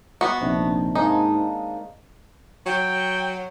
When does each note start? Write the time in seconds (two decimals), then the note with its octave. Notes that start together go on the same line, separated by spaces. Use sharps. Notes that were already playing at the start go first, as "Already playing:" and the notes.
0.21 B3 F#4
0.41 A#1 C3 D#3 D4
0.95 G#2 G#3 A#3 D#4 A4
2.66 F#3 G5